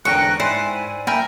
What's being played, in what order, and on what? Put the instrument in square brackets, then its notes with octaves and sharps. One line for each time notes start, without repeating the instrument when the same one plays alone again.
[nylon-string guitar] E2 D3 G5 [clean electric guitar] G#2 A4 A#4 [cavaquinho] C#6 [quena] F#6
[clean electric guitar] G#2 E4 [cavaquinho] C5 [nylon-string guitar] D5 [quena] G#5
[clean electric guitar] A#3 B5 [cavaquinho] A#4 E5 G5 [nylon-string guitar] G#5